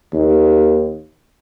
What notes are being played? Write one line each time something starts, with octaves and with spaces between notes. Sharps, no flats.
D#2